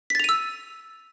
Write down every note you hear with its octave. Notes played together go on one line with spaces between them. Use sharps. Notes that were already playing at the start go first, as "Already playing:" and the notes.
E6 A6 B6 D#7 F7